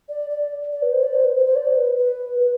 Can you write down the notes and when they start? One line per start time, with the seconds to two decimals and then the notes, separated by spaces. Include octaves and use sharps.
0.09 D5
0.30 D5
0.72 D5
0.82 B4
0.92 C5
1.03 D5
1.14 C5
1.24 B4
1.35 C5
1.46 C5
1.56 D5
1.67 C5
1.77 B4
1.98 B4
2.40 B4